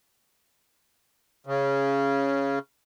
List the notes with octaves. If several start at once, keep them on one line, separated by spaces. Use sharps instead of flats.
C#3